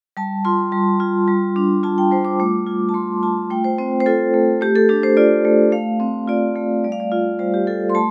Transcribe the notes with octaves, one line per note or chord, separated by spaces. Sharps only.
G3 A5
F4 C6
G3
F4
G3
D4
F4 A5
G5
G3 C5
D6
A3
F4
A5
A3 C6
F4 A5
A3 G5
C5
C4 C5
C5
F4 A4
A3
A3 G4
A4
D4 G4
C5
F4 D5
A3
A3 F5
C4
F4 D5
A3
G3 D5
F5
D5
F4
G3 C5
G4
F4 A4
C6
A3 A5